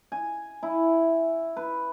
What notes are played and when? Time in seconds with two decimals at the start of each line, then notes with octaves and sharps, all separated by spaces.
0.12 G#5
0.63 E4
1.57 B4